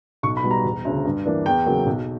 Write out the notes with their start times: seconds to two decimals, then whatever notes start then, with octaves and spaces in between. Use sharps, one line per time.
0.23 B1 C#6
0.37 B5
0.44 B2 G3
0.51 A#5
0.64 E1
0.85 D2 C#3
1.05 G2
1.26 E3 A#3 D4
1.46 E2 G5
1.66 C#3 F#3 A#3
1.87 B1